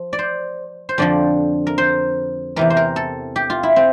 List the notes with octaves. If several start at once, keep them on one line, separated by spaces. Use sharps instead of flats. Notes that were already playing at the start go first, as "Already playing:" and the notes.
Already playing: F3
D5
C5
C5
F2 D3 F3 D5
A#4
C5
E2 C3 E3 A#4
C5
A#4
A4
G4
F4
E4
C4